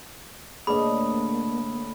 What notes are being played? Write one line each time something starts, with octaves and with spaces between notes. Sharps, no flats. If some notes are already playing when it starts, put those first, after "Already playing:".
A2 D3 A#3 G#4 B4 D#5 B5